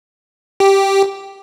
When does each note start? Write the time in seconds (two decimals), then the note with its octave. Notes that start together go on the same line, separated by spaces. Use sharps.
0.60 G4